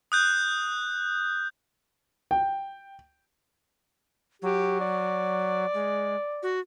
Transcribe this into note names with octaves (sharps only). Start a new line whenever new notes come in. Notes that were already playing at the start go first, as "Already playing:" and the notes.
D#6 F#6 G6
G5
F#3 G4
D5
G#3
F#4